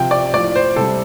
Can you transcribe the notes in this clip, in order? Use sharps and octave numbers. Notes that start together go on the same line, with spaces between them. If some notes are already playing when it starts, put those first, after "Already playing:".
Already playing: C3 F3 G5
D5
A2 F3 D5
C5
C3 G3 A4